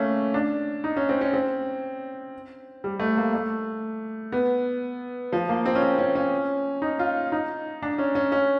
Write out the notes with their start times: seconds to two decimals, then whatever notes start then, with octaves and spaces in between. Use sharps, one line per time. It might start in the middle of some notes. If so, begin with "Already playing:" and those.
Already playing: A3 A#3 C#4
0.34 D4
0.84 D#4
0.96 C#4
1.09 C4
1.21 C#4
1.33 C4
2.84 G3
3.00 A3
3.17 A#3
3.34 A3
4.32 B3
5.33 F3
5.49 A#3
5.65 C4
5.75 C#4
5.82 C4
5.98 C#4
6.15 C#4
6.82 D#4
6.99 F4
7.32 D#4
7.82 D4
7.98 C#4
8.15 C#4
8.32 C#4